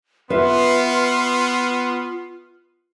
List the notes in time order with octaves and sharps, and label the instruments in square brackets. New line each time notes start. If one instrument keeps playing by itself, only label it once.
[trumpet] B3 [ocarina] F4 [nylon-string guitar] B4 E5 [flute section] C6 F6